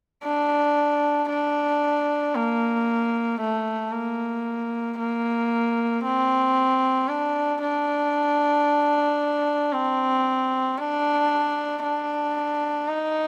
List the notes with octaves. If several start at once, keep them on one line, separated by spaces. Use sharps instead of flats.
D4
D4
A#3
A3
A#3
A#3
C4
D4
D4
C4
D4
D4
D#4